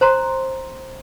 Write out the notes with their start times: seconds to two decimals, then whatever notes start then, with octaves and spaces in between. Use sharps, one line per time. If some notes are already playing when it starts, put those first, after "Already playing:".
0.01 C5 A#5 C6